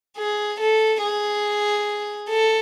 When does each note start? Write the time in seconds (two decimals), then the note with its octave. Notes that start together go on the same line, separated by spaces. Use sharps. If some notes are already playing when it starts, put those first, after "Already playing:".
0.18 G#4
0.60 A4
1.02 G#4
2.30 A4